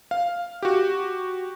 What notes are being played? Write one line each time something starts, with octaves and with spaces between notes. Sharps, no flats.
F5
F#4 G4